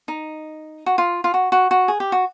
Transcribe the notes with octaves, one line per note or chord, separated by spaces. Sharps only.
D#4
F#4
F4
F4
F#4
F#4
F#4
G#4
G4
F#4